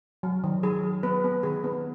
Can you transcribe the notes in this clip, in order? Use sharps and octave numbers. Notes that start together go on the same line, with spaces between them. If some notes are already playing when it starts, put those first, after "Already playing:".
F#3
D#3
F#3 G#4
F#3
B3 B4
B3
D#3 G#4
B3